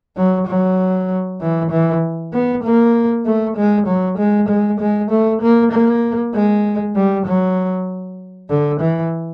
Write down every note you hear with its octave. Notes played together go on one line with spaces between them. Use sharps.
F#3
F#3
E3
E3
B3
A#3
A3
G#3
F#3
G#3
G#3
G#3
A3
A#3
A#3
G#3
G3
F#3
D3
E3